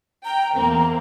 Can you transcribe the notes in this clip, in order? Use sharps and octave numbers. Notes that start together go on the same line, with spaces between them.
G5 A#5
E2 A#3 C4